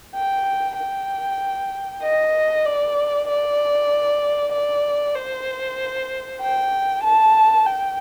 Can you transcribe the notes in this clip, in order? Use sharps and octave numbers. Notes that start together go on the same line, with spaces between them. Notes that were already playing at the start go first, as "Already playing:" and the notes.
G5
G5
D#5
D5
D5
D5
C5
G5
A5
G5